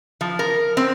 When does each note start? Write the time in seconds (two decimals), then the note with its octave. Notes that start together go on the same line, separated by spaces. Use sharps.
0.21 F3
0.39 A#4
0.77 C4